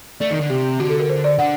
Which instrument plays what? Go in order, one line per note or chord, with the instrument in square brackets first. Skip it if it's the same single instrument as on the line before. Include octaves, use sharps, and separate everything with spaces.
[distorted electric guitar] A3 [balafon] D5
[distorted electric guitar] D#3
D3
[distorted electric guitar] C3 [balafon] G4
[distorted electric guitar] D3 [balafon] F#4
[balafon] A4
A#4
C5
D5
[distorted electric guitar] D3 [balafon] F#5